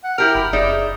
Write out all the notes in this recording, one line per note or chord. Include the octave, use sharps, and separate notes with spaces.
F#5
E4 G4 A#4 F6
F#1 B5
F#1 D#4 G#4 D5 E5